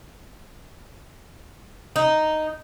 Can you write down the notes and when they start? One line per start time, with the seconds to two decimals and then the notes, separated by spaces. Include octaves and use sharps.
1.96 D#4